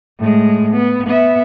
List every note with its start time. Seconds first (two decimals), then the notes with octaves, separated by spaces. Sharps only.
0.19 A2 G#3
0.74 B3
1.06 B3 E5